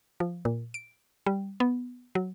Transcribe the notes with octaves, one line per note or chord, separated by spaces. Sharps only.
F3
A#2
D7
G3
B3
F#3